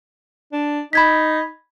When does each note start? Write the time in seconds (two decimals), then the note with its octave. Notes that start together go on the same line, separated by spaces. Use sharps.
0.53 D4
0.93 D#4 B5 G#6 B6